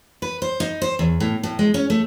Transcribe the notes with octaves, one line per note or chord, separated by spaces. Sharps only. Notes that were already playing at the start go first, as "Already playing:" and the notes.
B4
C5
D#4
C5
E2
A2
A2
G#3
C#4
A3